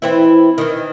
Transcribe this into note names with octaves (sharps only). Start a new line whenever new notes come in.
E3 C4 E4
D#3 E3